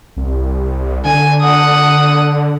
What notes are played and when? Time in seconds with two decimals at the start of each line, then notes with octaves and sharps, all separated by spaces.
0.16 C2
1.05 D3 G#5
1.41 F#5 D#6